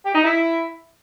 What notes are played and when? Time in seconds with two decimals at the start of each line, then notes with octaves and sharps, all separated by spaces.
0.05 G4
0.15 D#4
0.24 E4